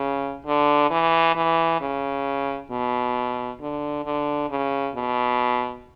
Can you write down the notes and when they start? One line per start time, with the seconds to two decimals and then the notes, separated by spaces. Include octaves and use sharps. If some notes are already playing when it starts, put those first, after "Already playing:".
Already playing: C#3
0.46 D3
0.91 E3
1.36 E3
1.81 C#3
2.71 B2
3.60 D3
4.05 D3
4.50 C#3
4.95 B2